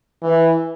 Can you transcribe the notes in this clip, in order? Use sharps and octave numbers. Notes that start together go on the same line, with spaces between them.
E3